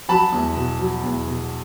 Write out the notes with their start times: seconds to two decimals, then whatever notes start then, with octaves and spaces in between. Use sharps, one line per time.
0.09 F#3 A5 B5
0.32 E2
0.56 B2
0.80 F#3
1.03 E2
1.27 B2